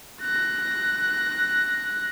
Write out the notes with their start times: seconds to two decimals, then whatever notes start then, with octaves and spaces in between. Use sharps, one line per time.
0.22 F#6 A#6